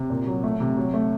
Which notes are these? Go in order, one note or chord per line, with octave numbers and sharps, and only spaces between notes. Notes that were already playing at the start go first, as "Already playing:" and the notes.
Already playing: C3
A#2
F#3
A3
C3
F#3
A3